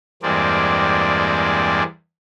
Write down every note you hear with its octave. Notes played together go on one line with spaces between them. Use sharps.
E2 G2 G#3 A#3 C4 D5